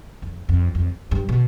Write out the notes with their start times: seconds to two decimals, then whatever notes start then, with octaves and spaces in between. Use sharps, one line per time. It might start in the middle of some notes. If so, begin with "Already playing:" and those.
0.22 F2
0.49 F2
0.75 F2
1.11 G2
1.29 B2